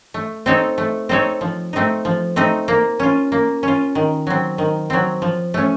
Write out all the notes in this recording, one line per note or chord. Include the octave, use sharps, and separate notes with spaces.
A3
C4 D#4 A4 C#5
A3
C4 D#4 A4 C#5
F3
A3 C4 D#4
F3
A3 C4 D#4
A#3
C#4 F4
A#3
C#4 F4
D#3
F#3 C4
D#3
F#3 C4
F3
A3 C#4